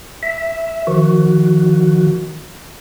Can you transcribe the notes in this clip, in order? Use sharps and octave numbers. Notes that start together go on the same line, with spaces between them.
E5
D#3 F3 F#4